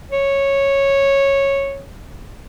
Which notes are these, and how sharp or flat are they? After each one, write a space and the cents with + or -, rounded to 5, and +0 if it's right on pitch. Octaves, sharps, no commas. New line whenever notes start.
C#5 -10